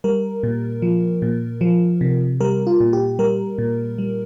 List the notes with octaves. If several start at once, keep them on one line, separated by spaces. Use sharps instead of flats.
G3 A#4
A#2
F3
A#2
F3
C3
G3 A#4
F4
A#2
G4
G3 A#4
A#2
G3